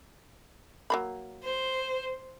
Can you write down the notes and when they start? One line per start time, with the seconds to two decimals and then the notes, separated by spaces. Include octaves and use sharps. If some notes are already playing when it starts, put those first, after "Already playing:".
0.90 F#3 A#3 B5
1.43 C5